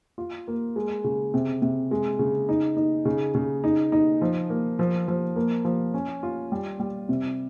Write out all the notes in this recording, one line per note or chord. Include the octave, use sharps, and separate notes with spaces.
F4
A#3
G#3
C#3
C3
C3
G#3
C#3
D#4
D#4
C#3
C#3
D#4
D#4
F3
A#3
F3
F3
A#3
F3
C#4
F4
G3
G3
C3